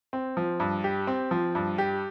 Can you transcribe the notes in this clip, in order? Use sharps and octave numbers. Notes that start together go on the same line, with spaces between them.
C4
F3
G2
G4
C4
F3
G2
G4